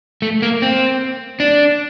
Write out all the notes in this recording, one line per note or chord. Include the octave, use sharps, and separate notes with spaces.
A3
A#3
C4
D4